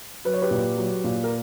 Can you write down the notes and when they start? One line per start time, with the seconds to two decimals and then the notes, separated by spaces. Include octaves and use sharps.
0.25 F#3 B4
0.33 C#5
0.42 G4 B4
0.51 A#2
0.77 F#3
1.04 A#2
1.24 A#4